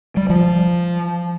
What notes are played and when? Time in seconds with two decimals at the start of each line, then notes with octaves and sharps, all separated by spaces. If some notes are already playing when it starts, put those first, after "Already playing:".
0.17 G3
0.30 F3